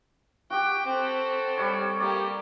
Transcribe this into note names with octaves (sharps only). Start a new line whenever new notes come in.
F#4 G4 G5
C4 A4
G3 C#5
A#3 G4 D5 G5